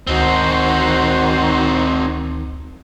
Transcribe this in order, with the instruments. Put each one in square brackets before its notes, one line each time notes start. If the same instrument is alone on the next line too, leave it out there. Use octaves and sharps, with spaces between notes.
[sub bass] D2 [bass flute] D#3 [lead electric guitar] C4 D#4 [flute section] F#4 C5